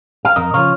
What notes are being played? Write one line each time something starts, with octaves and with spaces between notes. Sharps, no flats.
F5
F2 A#4 D#5
C#3 F3 C#5 F5